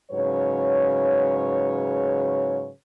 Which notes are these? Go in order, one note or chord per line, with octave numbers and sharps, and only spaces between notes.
G#2 C#3 F#3 B4 C#5